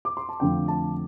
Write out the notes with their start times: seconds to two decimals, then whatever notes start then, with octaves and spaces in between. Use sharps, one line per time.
0.05 D6
0.17 C6
0.29 A5
0.40 F2 D3 F3 A3 G5
0.68 A5